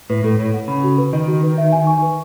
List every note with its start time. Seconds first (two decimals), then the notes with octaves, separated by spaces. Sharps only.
0.10 A2 B4
0.24 A2 A4
0.39 A2 C#5
0.54 F#5
0.68 C#3 B5
0.83 F#4
0.98 B4
1.13 D#3 D#5
1.27 F#4
1.43 B4
1.58 E5
1.72 G#5
1.87 C#6
2.02 B4